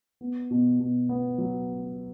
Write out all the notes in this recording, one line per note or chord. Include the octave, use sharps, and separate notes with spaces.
B3
B2
B2
B3
F#3